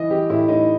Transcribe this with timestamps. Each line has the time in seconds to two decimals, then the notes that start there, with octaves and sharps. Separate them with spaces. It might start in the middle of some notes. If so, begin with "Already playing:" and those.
Already playing: E3 D#5
0.10 E3 G4
0.30 A2 E4
0.48 A2 D#4